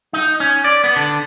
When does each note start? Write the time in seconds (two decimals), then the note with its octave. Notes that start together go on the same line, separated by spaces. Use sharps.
0.13 D#4
0.40 C#4
0.64 D5
0.84 B3
0.96 D3